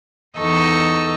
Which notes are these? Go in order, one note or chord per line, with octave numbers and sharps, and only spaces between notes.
E2 D#4 A4 D#5 C#6 E6